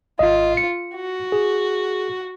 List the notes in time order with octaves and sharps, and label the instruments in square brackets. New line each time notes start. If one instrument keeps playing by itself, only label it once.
[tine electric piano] G#1 D#5 [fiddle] F4
[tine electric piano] C#7
[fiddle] F#4
[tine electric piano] G#4